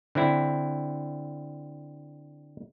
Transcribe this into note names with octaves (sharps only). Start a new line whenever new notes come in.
D3 C4 E4